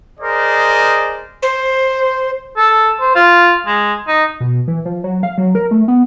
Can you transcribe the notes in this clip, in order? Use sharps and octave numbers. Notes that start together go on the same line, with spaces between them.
G#4 A#4 C5 D5 D#5
C5
A4
C5
F4
G#3
D#4
B2
E3
F3
F#3
F5
F#3
A#4
A3
B3